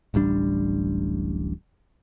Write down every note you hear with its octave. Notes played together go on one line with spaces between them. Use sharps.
D1 A1 G3 D4